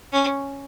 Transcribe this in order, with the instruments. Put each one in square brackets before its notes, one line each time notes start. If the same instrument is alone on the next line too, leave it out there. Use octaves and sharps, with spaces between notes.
[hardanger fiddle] C#4